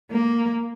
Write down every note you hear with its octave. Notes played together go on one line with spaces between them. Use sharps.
A#3